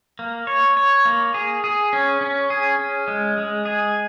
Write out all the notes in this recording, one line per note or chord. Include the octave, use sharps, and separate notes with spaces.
A#3
C#5
C#5
A#3
G#4
G#4
C#4
C#4
G#4
C#4
G#3
G#3
G#4